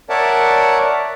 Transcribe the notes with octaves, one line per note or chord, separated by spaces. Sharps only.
A#4 C#5 D5 E5 F#5 A5